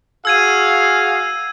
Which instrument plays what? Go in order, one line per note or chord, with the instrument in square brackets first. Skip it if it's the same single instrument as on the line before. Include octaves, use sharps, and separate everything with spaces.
[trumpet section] F#4 G#4 F5 [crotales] E6 G#6 D#7